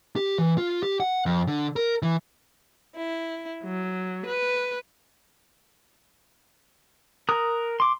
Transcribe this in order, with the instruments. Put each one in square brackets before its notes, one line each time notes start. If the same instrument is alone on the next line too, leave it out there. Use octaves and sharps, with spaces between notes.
[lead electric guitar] G4
E3
F4
G4
F#5
F2
D3
A#4
E3
[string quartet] E4
F#3
B4
[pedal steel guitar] A#4 A#5 D#6 F#6
C6 D6